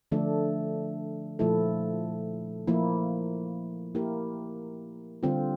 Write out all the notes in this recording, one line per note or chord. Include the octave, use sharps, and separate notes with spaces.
D3 F3 A3 D4 A4
A#2 F3 A3 E4 A4
F3 A#3 E4
A#3 E4 G4 A#4
D3 G3 C4 F4